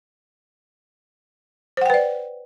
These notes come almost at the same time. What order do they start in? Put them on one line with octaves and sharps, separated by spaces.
C5 F#5 G5 B4 D5